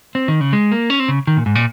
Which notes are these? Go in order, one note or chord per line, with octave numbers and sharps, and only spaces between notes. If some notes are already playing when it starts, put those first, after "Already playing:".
C4
D#3
C#3
G#3
A#3
C#4
C4
C#3
D#3
A#2
G#2
A#2